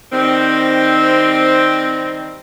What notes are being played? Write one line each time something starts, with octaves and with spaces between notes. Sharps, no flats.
D#3 G3 C4